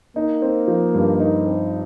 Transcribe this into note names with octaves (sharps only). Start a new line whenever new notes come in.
A#3 D#4
C4
F3
G2
D#4
C4